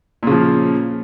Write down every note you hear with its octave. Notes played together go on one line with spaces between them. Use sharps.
A#2 C#3 F3